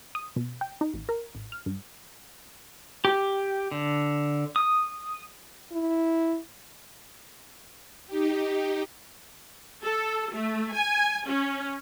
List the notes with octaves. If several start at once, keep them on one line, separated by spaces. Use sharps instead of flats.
D#6
B2
G5
D#4
A1
A#4
A1
F6
G2
G4
D3
D#6
E4
D#4 G4
A4
A3
G#5
C#4